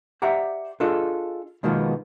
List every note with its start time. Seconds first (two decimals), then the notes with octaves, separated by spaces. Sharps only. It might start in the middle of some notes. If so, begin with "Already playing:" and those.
0.22 G4 C5 D5 E5 F#5 A#5
0.80 D4 F4 G#4 A4 D#5
1.63 B2 D#3 F3 G#3 A#3 B3